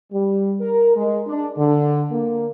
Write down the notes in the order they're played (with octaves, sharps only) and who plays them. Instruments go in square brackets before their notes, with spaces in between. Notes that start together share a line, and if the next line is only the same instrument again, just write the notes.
[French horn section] G3
A#4
G#3
D4
D3
A#3